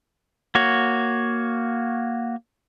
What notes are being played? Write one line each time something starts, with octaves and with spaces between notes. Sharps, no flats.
A#3 F#4 C#5